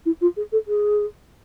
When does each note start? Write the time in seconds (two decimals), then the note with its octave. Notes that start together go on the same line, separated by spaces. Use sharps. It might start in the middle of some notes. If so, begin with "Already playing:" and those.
0.06 E4
0.21 F4
0.37 G#4
0.52 A4
0.68 G#4